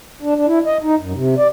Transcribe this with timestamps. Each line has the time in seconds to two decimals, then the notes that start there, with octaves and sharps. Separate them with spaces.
0.22 D4
0.36 D4
0.47 E4
0.66 D#5
0.83 D#4
0.99 F#2
1.14 C3
1.38 D5